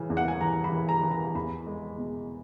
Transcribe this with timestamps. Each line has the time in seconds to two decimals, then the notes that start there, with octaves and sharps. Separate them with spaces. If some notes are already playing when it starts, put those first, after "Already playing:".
Already playing: C#3 E3
0.10 E2
0.17 F#5
0.28 G#5
0.41 E3 A#5
0.64 B5
0.72 E3
0.89 A#5
1.03 E3
1.11 A#5
1.35 E2 B5
1.67 G#3
1.98 B2